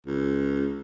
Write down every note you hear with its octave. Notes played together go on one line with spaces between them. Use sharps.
C#2